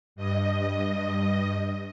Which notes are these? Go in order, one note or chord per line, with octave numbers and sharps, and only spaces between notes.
G2 D#5